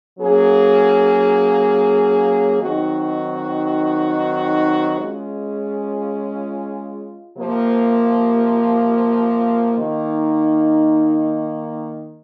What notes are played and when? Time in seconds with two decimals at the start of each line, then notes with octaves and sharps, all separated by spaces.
0.19 F#3 A#3 C#4 G#4
2.59 D#3 F#3 C4 D#4 F#4
4.97 G#3 C#4 F4 G#4
7.37 C3 F3 A#3
9.76 D#3 A#3 D#4